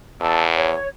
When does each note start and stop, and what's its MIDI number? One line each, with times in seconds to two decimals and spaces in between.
0.21 0.76 40
0.21 0.43 81
0.21 0.43 88
0.55 0.86 73